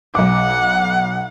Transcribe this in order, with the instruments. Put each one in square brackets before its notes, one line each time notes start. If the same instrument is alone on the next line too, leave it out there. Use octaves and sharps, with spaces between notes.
[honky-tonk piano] B1 D6 [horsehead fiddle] F#5